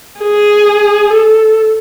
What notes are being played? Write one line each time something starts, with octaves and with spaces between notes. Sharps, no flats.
G#4
A4